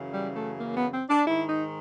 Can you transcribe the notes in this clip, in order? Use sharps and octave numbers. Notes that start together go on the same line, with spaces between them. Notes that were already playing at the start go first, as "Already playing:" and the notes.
Already playing: F#2 C#3 E3
G3
A3
A#3
B3
C4
D4
G#2 D#3 E4
D#4